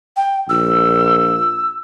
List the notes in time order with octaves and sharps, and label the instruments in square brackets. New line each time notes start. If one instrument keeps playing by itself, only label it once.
[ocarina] G5
[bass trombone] A#1 [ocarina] E6